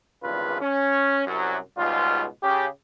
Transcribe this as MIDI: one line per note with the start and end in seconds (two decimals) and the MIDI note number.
0.23 0.58 32
0.23 0.58 40
0.23 0.58 43
0.23 0.58 49
0.23 0.58 65
0.23 0.58 71
0.61 1.26 61
1.26 1.57 36
1.26 1.57 42
1.26 1.57 54
1.77 2.25 37
1.77 2.25 44
1.77 2.25 47
1.77 2.25 55
1.77 2.25 65
2.43 2.66 49
2.43 2.66 67